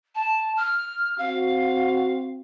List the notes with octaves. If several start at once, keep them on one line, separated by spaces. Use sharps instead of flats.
A5
F6
C4 F#4 F5